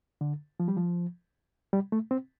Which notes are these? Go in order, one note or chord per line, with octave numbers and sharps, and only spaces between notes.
D3
F3
G3
F3
G3
A3
C4